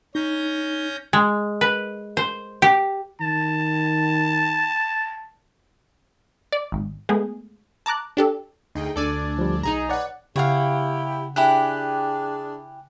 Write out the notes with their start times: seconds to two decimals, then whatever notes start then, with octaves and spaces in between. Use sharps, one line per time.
0.15 C#4 D#4 G6 A#6
1.13 G#3
1.61 B4
2.17 C5
2.62 G4
3.21 D#3 A5
6.52 D5
6.72 G#1
7.09 G#3 A3 B3 G#4
7.86 A5 A#5 D6 F#6
8.17 D4 G4 A4
8.75 D2 D#4 G#4 G5
8.96 D2 D4 A4 D5 G#5
9.38 F3 G3
9.63 B1 D#4 G#4 A#5
9.89 B4 C#5 D5 F#5
10.36 C#3 E4 G4 C#5 F5 F#5
11.36 D4 E4 G4 G#4 G5 G#5 F#6